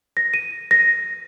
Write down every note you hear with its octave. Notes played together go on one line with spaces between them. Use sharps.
A#6
D#7
A#6